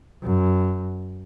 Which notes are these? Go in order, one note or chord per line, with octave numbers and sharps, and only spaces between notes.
F#2